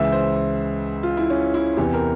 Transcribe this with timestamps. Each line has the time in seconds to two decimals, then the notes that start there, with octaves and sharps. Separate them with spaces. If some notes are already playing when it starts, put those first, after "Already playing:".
Already playing: C#2 C#3 E3 E5
0.12 C5
1.03 F4
1.17 E4
1.30 C#4
1.54 E4
1.77 E2 C3 E3 G4
1.94 A#4